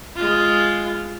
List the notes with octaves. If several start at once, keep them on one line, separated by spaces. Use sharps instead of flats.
G#3 F4